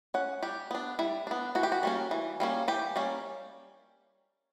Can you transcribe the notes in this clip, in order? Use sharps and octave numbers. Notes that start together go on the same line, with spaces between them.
C#4 F#5
G3 G4
B3 D4
G3 E4
B3 D4
E3 F#4
G4
F#4
G3 A#3 C#4
E3
G3 A#3 C#4
E3 G4
G3 A#3 C#4